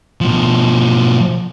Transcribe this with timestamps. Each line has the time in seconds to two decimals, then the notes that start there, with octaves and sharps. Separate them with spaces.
0.21 B2 F3